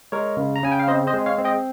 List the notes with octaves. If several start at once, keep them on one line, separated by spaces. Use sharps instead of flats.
G#3 A#4 C#5
C#3
A#5
C#3 G#5
G5
F5
C4 C5 D#5
C5 D#5
G#3
C#5 F5
C4
D#5 G5